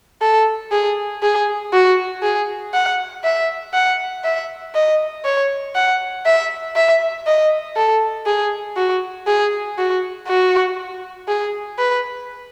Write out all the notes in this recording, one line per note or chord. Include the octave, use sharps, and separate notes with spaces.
A4
G#4
G#4
F#4
G#4
F#5
E5
F#5
E5
D#5
C#5
F#5
E5
E5
D#5
A4
G#4
F#4
G#4
F#4
F#4
G#4
B4